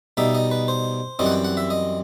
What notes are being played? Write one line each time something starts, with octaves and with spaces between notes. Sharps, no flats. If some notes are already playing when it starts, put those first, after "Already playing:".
B2 G3 D#4 E5
D#5
B4
C5
F#2 E3 G3 C4 D#5
F#5
G5
F#5
E5
D#5